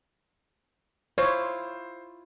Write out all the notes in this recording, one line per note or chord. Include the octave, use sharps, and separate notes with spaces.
E4 F4 C5 C#5